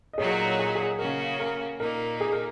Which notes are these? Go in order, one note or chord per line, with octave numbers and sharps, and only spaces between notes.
D#5
A#2 F#3 D#4 F#4 G#4 C#5
G#4
G#4
C#3 A#3 C#4 F#4 A#4
A#4
A#2 A#3 D#4 A#4
G#4
A#4